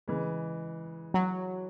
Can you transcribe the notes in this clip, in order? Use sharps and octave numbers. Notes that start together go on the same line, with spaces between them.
C#3 E3 G#3
F#3